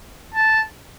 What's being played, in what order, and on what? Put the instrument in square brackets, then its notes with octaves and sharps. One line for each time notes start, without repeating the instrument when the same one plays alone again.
[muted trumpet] A5